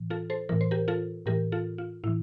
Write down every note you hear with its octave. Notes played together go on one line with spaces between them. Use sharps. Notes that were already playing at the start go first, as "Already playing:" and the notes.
Already playing: A2 E3
F4 A4
A4 C5
A2 E3 A#4
C5
G4 A#4
F4 A4
A2 E3 G4 A#4
F4 A4
F4
A2 E3 E4